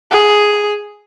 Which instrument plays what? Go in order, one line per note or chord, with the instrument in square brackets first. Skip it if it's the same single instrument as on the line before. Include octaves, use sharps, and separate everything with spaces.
[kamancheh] G#4